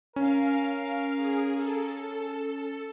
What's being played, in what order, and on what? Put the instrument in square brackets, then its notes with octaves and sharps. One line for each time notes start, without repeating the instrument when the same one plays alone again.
[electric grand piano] C#4 [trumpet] A#4 [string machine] F5
[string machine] G#4
A4